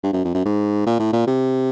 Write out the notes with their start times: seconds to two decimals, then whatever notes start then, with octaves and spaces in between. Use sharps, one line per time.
0.03 G2
0.13 F#2
0.24 F2
0.35 F#2
0.45 G#2
0.86 A#2
1.00 A2
1.13 A#2
1.27 C3